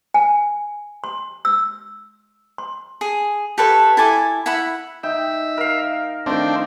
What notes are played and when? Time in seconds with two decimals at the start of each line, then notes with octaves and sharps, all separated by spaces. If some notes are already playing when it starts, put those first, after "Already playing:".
0.14 G#5
1.04 C6
1.45 E6
2.58 C6
3.01 G#4
3.58 G4 A4 B4 C#5
3.97 E4 A4 G#5 D6
4.46 E4 E5 F#5 B5
5.03 D#4 E5 G5
5.57 A#4 F5
6.26 D#3 F3 A3 C4 D4